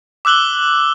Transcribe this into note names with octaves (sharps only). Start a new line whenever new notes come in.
D6 E6 F#6 F#7 G7